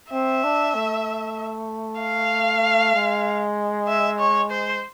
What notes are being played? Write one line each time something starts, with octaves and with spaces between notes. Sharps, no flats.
C4 E5
D4
A3
F5
G#3
E5
C#5
C5